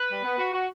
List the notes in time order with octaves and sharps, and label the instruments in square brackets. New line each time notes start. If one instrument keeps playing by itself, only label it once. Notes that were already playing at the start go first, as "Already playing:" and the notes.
Already playing: [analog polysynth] B4
[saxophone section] G3
B3
F#4
F#4